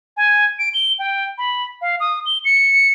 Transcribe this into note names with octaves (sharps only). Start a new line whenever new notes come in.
G#5
D7
G7
G5
B5
F5
D#6
G7
C#7